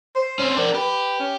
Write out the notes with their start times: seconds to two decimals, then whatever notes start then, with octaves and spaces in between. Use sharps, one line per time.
0.15 C5
0.39 C4 C#4
0.56 D4 A#4
0.74 G4 B4
1.20 C#4